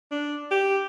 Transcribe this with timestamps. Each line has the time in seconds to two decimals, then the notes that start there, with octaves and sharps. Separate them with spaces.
0.11 D4
0.51 G4